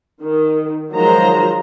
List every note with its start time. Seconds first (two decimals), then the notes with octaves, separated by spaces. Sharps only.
0.22 D#3
0.93 D#3 F3 F#3 G#3 C5 A#5